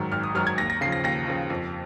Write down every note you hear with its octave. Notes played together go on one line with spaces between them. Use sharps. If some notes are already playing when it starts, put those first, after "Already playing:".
Already playing: G#2 D#3 F#3
G#1 F6
D#6
G#2 D#3 F#3 F6
G#6
D#2 A#6
A#6
C#3 F3 C7
A#6
D#2 A#6
C#3 F3
F2